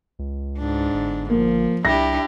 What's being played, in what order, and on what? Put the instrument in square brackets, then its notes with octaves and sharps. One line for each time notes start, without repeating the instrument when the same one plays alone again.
[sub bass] C#2
[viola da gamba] G#2 D4
[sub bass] G1
[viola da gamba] F3 [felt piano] A#3
[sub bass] C2 [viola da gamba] D4 E4 G4 [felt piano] A#6